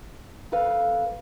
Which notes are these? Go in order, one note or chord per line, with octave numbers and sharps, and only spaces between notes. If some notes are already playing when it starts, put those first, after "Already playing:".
F2 A4 B4 F5